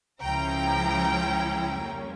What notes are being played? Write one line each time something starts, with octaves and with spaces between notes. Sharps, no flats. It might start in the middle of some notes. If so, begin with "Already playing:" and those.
C#2 C#3 F3 C#4 E4 G5 A#5
F2 C#3 G3 A#3 C#4